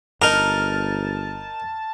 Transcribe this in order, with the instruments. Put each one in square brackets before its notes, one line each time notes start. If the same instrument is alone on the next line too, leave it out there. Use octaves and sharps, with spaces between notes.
[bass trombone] G1 [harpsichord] D#4 A#4 [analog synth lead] A5 [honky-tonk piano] F6